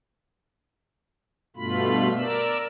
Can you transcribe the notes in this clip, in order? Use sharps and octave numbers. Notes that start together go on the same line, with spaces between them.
G2 B2 A3 F4 B5
A#4 D5 E6